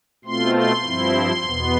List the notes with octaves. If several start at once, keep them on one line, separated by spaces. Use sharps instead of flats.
B2 A3 C4 F4 C6
C6
G2 F3 C4 E4
E2 B2 B3